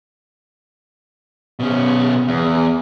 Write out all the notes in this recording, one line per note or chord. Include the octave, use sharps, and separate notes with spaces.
B2 C#4
E2